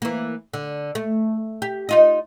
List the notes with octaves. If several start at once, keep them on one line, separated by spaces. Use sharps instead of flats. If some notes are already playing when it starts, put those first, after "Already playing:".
E3 A#3
D3
A3
G4
D#4 F4 D#5